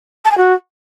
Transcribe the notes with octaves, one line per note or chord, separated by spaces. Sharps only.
A5
G#5
F#4